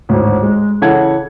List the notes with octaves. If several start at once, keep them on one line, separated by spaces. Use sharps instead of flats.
G#1 D2 A2
G#3
C#3 E3 A4 F#5 G#6